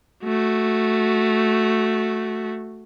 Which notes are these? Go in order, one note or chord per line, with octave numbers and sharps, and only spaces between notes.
A3 F#4